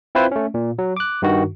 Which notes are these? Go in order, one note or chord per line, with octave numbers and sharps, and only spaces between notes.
C4 E4 F4 B4 C5
A3 C#4
A#2
F#3
D6 F#6
G2 D#3 F#4